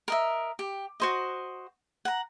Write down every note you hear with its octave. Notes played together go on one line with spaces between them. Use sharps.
A#4 D#5 E5
G4
F#4 C5 D#5
F#5 A#5